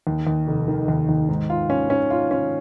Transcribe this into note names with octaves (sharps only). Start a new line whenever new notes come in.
D#2
D#2
F1
D#3
D#2
D#2
G#2
F4
C#4
C#4
F4
C#4